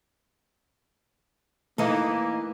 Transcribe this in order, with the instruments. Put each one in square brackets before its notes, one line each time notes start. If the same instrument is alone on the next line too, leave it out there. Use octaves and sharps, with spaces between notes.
[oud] E3 D#4 [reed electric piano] A3 [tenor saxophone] A#3